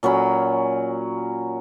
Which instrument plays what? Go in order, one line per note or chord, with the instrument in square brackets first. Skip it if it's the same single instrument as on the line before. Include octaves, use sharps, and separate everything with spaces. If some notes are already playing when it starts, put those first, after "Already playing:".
[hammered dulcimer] A#2 F#3 C#4 B5